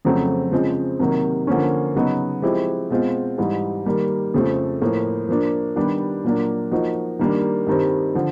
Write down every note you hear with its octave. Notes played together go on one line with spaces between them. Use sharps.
F2 C#3 F#3 A3 C4
C#3 F3 G#3 C4
C3 D#3 F#3 A#3
D3 F3 A#3 C#4
C#3 F#3 B3 D#4
F3 G#3 C4 E4 G4
B2 G#3 C4 F4
G#2 E3 G3
D#3 G3 A#3
F2 C#3 F3 A3
A2 F3 A#3
F3 A#3 D4
D#3 G3 B3 D4 G4
A#2 F#3 A#3 D4
F3 A#3 D#4 F#4
D#3 G3 A#3 D4
G2 D#3 G3 C4
D3 F3